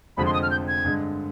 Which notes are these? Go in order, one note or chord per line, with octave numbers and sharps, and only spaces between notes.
F1 F2 D3 F3 G#3 B5
C6
D#6
F6
G6
G#6
G2 D3 G#3